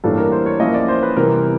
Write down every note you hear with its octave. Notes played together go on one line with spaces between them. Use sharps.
A2 E3 G3 A#3 D4 A4
A#4
C5
C#5
F3 A#3 C#4 E4 D#5
D5
C5
B4
C3 E3 G3 B3 A#4